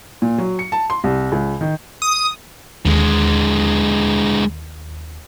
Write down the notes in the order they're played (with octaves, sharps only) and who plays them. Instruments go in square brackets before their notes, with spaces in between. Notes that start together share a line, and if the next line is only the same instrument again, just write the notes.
[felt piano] A#2
F#3
C#7
A5
C6
C2
C#2
D#3
[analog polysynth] D#6
[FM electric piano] D#2 [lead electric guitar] D3 G#3